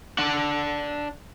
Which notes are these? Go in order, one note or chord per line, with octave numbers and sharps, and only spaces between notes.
D4 F#5